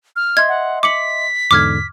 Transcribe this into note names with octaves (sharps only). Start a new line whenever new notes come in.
F6
D#5 E5 C6 G#6
F#5
D6 B6 C#7 F#7
E2 G#2 D3 D6 F6 G#6